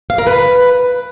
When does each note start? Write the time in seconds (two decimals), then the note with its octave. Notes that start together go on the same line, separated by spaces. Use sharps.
0.10 F5
0.18 A#4
0.27 B4